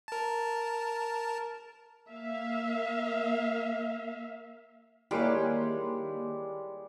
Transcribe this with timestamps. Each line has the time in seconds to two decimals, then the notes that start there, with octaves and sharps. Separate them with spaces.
0.08 A#4 A5
2.09 A#3 E5 F5
5.11 D#3 G3 G#3 A#3 E4 G4 A#4 C#5